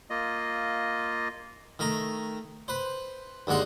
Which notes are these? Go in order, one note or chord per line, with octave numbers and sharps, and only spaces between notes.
A#3 F4 D#5
D#3 A3 A#5
B4 C5
D#2 D3 G#3 F#5 C6